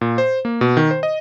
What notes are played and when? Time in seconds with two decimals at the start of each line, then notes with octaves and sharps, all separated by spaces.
0.01 A#2
0.18 C5
0.45 A#3
0.61 B2
0.77 D#3
0.91 C5
1.03 D#5